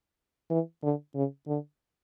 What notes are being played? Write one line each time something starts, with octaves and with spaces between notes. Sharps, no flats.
E3
D3
C#3
D3